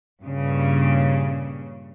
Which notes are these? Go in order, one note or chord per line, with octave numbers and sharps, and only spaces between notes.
G2 A#2 C#3